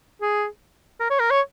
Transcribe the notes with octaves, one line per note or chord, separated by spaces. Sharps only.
G#4
A#4
C#5
A#4
C#5